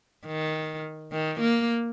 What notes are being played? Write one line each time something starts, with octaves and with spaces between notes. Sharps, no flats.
D#3
D#3
A#3